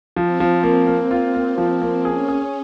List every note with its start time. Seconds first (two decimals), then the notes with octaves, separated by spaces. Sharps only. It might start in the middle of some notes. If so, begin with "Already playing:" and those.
0.16 F3 C4
0.40 F3
0.63 A#3
0.87 A#3
1.11 F4
1.35 A#3
1.58 F3
1.82 A#3
2.05 C#4 G#4
2.28 G#4